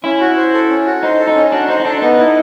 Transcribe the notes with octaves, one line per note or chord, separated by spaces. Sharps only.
C#4 E4
F#4
C5
A4
C#4
F#4
D#4 C5
A4
D#4
C#4
D4 F#4
D#4 C5
D#4
D4 A4
B3 D#4
E4